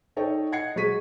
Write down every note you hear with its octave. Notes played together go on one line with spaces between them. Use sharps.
D#4 A4 C#5 D#5 G5
D#5 F#5 G#6 C7 C#7
F#3 G#3 G#4 C#6 B6 D#7